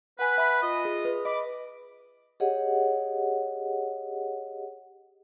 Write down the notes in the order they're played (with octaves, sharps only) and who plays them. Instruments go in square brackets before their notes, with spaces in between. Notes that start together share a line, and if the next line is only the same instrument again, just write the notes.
[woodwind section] B4 [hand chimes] F#5 G#5
[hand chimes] E5 B5
[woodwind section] F4 D#5
[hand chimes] G#4
B4
[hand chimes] D#5 [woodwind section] B5 D6
[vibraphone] G4 G#4 C#5 D#5 F#5